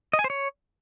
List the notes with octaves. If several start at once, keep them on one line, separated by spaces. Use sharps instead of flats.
D#5
G#5
C5
C#5